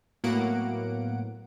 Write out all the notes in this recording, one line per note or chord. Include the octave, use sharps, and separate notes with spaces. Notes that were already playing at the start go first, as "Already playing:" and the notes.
A2 F#3 A#3 B3 F#5 D7